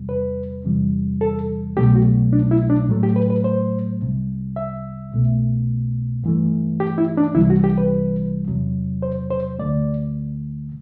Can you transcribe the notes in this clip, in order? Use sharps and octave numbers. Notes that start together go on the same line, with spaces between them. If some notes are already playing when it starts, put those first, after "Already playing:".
Already playing: E2 C3 G3
B4
E2 C3 E3 G3
A4
C2 B2 F#3 A3 G4
F#4
D4
E4
D4
A2 F#3 A3
G4
B4
B4
C5
C2 C3 G3
E5
C2 B2 A3
G2 E3 A3
G4
E4
D4
C2 C3 E3 G3 E4
F#4
G4
B4
E2 C3 F#3
C5
C5
D2 D3 A3 D5